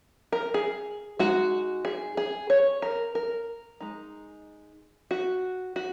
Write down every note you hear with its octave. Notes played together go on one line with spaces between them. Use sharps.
A#4
G#4
G#3 D#4 F#4
G#4
G#4
C#5
A#4
A#4
G#3 D#4
F#4
F#4